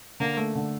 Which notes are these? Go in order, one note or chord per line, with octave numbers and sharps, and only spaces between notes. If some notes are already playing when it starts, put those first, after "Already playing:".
D3 A#3
A3
D3